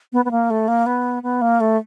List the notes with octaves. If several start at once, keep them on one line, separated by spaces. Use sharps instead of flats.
B3
B3
A#3
A3
A#3
B3
B3
A#3
A3